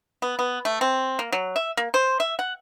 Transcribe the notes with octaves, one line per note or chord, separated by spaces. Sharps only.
B3
B3
A3
C4
A#3
F#3
E5
A#3
C5
E5
F#5